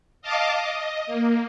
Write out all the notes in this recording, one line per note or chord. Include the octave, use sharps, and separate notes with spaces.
D#5 F5 A5 D6
D#5
A#3